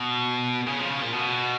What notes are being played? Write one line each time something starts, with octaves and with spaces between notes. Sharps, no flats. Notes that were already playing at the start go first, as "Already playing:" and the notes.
Already playing: B2
C#3
F3
C#3
A#2
B2